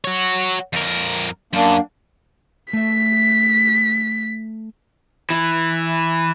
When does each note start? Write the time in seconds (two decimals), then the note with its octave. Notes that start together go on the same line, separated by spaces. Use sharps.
0.04 F#4 C#5
0.73 F2 A#4
1.53 F#2 A#3 D4
2.73 A3 E5 B6
5.30 E3